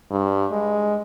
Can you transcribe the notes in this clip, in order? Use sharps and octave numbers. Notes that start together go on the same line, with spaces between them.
G2
G#3